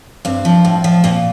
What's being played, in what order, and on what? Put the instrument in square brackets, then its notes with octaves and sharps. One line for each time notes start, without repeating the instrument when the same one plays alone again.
[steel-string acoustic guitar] G2 C4
F3
A2
F3
A#2 C4